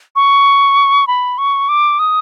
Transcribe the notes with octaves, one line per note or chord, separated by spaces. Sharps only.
C#6
B5
C#6
D6
D#6